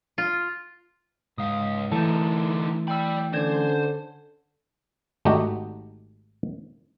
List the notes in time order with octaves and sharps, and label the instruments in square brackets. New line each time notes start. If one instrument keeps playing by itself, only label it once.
[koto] F4
[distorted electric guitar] C#2 F5 [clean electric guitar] G#2 [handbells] D#6
[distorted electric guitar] D3 D#4 [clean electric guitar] E3 A3 [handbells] A5
[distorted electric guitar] D5 B5 [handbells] G5 E6
[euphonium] D3 [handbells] C#4 D5 G#6 [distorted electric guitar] C5
[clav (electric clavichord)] G#1 A3 D4 D#4 F#4 G4